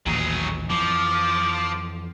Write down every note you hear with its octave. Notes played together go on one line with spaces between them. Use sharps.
A1 D#2 A#2 F#3 G#4
F2 E3 F3 D6